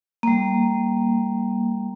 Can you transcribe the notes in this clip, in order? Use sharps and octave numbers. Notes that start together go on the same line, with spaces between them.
G3 A#3